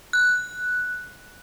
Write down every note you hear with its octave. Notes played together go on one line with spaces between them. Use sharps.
F#6